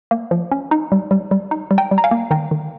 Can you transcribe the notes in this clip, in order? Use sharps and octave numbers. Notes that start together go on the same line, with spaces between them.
A#3
F3
C#4
D#4
G3
G3
G3
D#4
G3
G5 A#5
G3
A#5
F5 G#5
A#3
D#3 G5 A#5
D#3